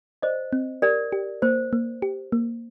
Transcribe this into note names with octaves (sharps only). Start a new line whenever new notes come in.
C5 D5 D#5
C4
G4 A#4 D5
G4
A#3 C5
A#3
G4
A#3